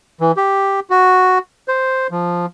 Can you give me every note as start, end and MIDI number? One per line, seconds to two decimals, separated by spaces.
0.21 0.32 52
0.37 0.80 67
0.90 1.38 66
1.68 2.07 72
2.11 2.46 53